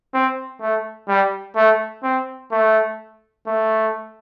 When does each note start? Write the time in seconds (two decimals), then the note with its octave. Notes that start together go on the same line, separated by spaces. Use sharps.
0.14 C4
0.61 A3
1.08 G3
1.56 A3
2.03 C4
2.52 A3
3.47 A3